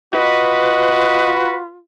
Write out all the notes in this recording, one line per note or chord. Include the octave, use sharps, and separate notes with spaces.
F4 F#4 B4 D#5